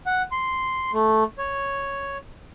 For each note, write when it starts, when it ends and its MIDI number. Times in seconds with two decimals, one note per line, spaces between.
0.06 0.22 78
0.32 0.91 84
0.93 1.24 57
1.38 2.18 73